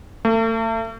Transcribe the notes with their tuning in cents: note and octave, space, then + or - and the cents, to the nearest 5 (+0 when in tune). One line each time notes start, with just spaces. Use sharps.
A3 +40